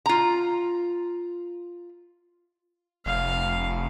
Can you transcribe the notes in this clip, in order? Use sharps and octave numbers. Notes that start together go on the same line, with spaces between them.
F4 A#5
F1 F5